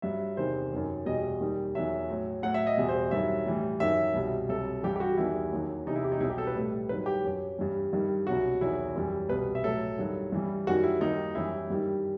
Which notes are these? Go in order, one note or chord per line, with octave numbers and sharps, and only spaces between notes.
G2 F#3 E5
E2 C3 D#3 C5
F#2 D#3 F#3
E2 B2 G3 D#5
D#2 D#3 G3
E2 D#3 F#3 E5
A2 F#3
A2 F#3 F#5
E5
D#5
E2 B2 G3
C5
G2 D#3 F#3 E5
A2 E3 G3
F#2 D#3 F#3 E5
C2 B2 G3
C2 C3 F#3 A4
G2 E3 G3 G4
G4
F#4
E2 D#3 G3 E4
D#2 D#3 F#3
E2 C3 E3 D#4
E4
G4
D#4
C2 B2 F#3 E4
G4
A4
B4
A2 G3
G2 D#3 F#3 B4
G4
F#2 F#3
G2 E3 G3
G2 D#3 G3
C2 B2 F#3 F#4
E2 D#3 F#3 E4
F#2 E3 G3
C2 B2 G3 B4
E5
A2 F#3 A4
G2 D#3 F#3
G2 E3 G3
F#2 D#3 G3 F#4
E4
D#2 D#3 G3 D#4
F#2 E3 G3 E4
G2 D#3 G3